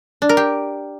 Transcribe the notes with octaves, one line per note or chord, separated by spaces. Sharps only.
D4
A#4
G4